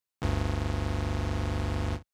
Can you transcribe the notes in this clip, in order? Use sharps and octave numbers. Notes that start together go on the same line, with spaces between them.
G1 D2 G2